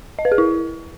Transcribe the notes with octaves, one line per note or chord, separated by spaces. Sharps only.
D#5
B4
G#4
E4